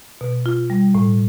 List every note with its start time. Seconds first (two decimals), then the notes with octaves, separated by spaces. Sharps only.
0.21 B2
0.46 F4
0.70 G3
0.95 A2